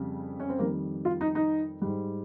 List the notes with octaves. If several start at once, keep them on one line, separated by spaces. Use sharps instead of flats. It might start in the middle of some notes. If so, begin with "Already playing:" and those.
Already playing: F2 C#3 G3
C#4
C4
F2 D#3 G3 A#3
F4
D#4
D#4
G#2 G3